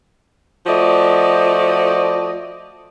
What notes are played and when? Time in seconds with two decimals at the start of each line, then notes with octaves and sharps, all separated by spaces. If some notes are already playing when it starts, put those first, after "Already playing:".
0.67 F3 A3 F#4 D5 D#5